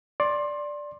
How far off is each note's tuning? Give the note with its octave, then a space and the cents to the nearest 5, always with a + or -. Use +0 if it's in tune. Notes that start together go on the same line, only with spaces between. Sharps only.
D5 +0 C6 +25